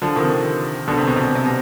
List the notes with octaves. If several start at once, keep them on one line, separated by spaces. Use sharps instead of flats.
D3 F3
C3 D#3
B2 D3
C3
B2
C3
B2
C3
B2